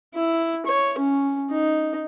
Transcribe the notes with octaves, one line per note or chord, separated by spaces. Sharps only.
E4
C#5
C#4
D#4